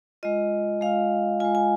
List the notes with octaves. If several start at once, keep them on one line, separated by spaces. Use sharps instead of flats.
G#3 F4 D#5
G#3 F4 F5
G#3 F4 G#5
G#5